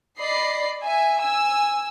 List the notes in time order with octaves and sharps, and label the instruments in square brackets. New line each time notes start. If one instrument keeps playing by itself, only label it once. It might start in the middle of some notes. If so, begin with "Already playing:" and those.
[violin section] D5 D#5 B5 C7
E5 G#5
G#5 E6